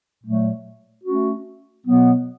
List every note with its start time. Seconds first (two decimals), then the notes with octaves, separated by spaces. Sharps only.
0.23 A#2 F#3 A3
1.04 A3 C#4 F#4
1.85 B2 F#3 B3